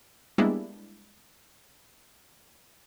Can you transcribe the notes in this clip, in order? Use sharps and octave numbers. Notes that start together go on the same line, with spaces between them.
G3 G#3 A#3 B3 D4 E4